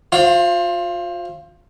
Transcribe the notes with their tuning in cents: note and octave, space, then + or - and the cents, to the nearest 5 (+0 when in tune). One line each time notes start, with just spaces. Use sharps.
F4 +35 C5 +20 F5 -25